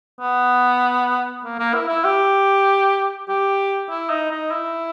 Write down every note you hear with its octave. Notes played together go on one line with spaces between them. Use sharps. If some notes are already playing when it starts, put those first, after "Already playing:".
B3
A#3
A#3
E4
E4
G4
G4
E4
D#4
D#4
E4